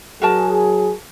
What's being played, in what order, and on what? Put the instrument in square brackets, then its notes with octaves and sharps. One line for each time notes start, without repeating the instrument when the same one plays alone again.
[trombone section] F#3 G#4 [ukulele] F#4 A#4 A5